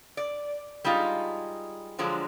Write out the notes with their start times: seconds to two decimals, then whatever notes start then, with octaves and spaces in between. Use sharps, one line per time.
0.17 D5
0.84 G3 G#3 D#4 F4
1.99 D3 F3 F#3 G#3